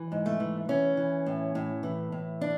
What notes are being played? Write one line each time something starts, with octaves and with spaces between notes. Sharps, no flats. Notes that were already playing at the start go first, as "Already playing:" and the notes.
Already playing: E3
G#2
A3
E3
E3 C#4
E3
A2
A2
E3
A2
D4